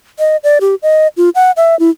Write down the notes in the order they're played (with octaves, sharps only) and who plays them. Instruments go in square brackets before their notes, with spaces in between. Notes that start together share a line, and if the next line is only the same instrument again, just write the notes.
[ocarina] D#5
D5
G4
D#5
F4
F#5
E5
E4